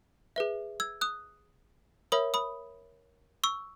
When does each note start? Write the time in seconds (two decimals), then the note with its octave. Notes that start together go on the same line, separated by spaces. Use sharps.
0.36 G#4 B4 E5
0.80 E6 G#6
1.01 D#6 F#6
2.12 A#4 C#5 E5 B5 D#6
2.34 B5 D#6
3.44 C#6 E6